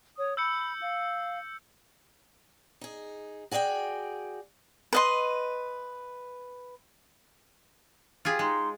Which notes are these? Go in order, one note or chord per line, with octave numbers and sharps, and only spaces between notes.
C#5 D#6
B5 E6 G6 C#7
F5
D#4 G#4
F#4 G#4 D5 F5 G5
B4 D#5 C6
F4 G4 G#4
G#3 D#4 C6